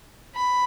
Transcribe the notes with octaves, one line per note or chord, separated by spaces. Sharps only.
B5